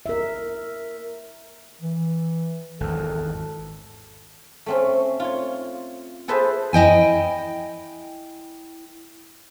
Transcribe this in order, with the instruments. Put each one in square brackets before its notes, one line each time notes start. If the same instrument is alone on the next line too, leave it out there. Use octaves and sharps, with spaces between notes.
[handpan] A#4 E5
[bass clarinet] E3
[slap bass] G#1 E2 [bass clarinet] A4
[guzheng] A3 C4 C#4
F4 C#5
G#4 A4 B4 C5 E5 A5
[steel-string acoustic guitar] E4 D#5 G5 G#5